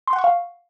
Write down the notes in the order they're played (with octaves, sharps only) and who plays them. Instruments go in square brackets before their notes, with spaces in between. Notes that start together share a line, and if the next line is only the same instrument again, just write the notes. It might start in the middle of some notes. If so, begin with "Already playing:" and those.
[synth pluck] C6
F#5
C#6
F5